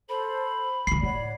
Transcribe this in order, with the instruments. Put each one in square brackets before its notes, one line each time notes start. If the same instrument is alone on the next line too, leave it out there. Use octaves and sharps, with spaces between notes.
[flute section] A4 C5 [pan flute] B5
[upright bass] D2 G#2 [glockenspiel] C7
[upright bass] A2 [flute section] C#5 D5 F#5